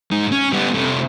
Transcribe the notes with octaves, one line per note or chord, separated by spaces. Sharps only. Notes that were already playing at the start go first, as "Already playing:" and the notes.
G#2 D#4
C#4
G3 B3
C3 A3